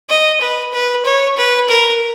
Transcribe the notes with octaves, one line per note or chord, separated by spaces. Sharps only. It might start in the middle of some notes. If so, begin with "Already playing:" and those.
D#5
B4
B4
C#5
B4
A#4